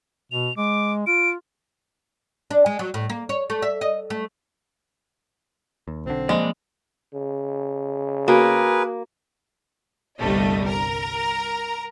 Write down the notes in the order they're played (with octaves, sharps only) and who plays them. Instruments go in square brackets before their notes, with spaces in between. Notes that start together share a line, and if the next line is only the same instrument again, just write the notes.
[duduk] B2 [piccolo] F7
[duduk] G#3 [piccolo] D6
[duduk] F4 [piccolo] D7
[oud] D4
G#3
F#3
A2
A#3
C#5
A3
E5
D#5
A3
[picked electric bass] D#2
[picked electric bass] B1 D3 [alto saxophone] C4
[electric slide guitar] F3 A#3 D5 [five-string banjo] G#3
[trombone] C#3
[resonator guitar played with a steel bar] A#3 [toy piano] F#4 B5 [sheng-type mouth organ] G#4 A#4 B4
[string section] G1 C2 G2 G3 A3 D#5
A#4 A#5